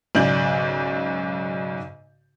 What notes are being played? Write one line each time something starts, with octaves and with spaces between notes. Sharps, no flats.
B1 G#2 C#3 D5 G6 F#7